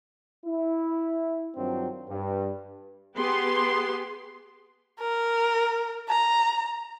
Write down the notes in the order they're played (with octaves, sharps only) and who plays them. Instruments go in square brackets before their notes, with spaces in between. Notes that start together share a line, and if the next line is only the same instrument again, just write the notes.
[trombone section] E4
G2 D#3 F#3 C4 D4 F4
G2
[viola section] B3 G4 G#4 C6
[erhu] A#4
A#5